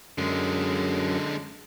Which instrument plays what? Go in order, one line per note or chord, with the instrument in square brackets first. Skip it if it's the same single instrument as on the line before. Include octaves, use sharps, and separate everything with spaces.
[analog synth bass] F#2 [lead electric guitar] D3 G#3